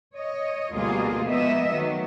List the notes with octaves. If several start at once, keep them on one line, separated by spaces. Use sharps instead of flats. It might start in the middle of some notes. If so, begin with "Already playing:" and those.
C#5 D#5
D2 B2 G3 A#3 F4 G#4
F3 G#3 A#3 B3 D#5 E5
D#3 F#3 A3 B3